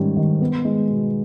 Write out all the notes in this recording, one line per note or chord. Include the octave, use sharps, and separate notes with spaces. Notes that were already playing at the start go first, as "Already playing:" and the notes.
Already playing: G#2 D#3 G3 C#4
D#3
B3
G#3
B2